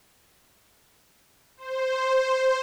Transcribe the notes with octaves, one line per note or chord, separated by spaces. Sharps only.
C5